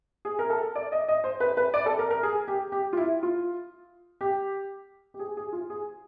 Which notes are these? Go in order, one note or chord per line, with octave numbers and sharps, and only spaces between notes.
G#4
A#4
A4
D5
D#5
D#5
C5
B4
B4
D5
A4
A#4
A#4
G#4
G4
G4
F4
E4
F4
G4
G4
G#4
G#4
F4
G#4